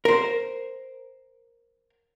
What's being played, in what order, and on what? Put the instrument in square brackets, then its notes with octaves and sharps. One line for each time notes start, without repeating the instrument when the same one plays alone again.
[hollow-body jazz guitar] A#4 C5